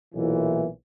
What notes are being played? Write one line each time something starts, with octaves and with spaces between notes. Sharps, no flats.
B1 A#2 E3